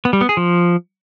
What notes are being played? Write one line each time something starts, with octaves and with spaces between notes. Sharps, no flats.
B3
G3
B3
G#4
F3